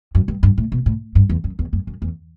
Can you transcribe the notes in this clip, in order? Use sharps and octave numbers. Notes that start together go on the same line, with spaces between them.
F#2
G2
G2
A2
B2
A2
G2
E2
F#2
E2
F#2
F#2
E2